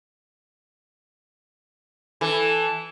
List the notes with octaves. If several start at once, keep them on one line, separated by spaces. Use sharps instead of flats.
E3 A4